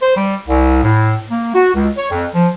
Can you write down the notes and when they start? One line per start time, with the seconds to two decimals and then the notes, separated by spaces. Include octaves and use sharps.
0.02 C5
0.17 G3
0.47 C2
0.83 A2
1.31 A#3
1.55 F#4
1.75 C#2
1.98 C#5
2.11 F2
2.35 F3